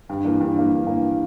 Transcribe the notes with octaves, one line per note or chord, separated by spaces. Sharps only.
G2
E3 A#3
G2
E3 A#3
G2
E3 A#3